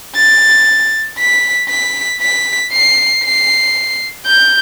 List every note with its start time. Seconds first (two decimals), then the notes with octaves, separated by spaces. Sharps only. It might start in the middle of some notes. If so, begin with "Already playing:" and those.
0.16 A6
1.19 B6
1.70 B6
2.21 B6
2.72 C7
3.24 C7
4.27 G6